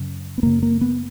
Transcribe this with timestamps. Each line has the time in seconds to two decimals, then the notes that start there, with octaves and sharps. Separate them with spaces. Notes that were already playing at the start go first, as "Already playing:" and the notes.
Already playing: F#2 C#3
0.38 B3
0.43 F#2 C#3 A#3
0.63 A#3
0.81 B3